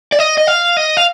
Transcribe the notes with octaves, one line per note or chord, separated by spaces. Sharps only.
D5
D#5
D#5
F5
D#5
F5